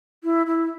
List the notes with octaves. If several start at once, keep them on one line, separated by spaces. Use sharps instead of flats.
E4
E4